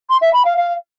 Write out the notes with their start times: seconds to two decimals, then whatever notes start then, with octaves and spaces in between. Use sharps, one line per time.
0.10 C6
0.22 E5
0.33 B5
0.45 F5
0.57 F5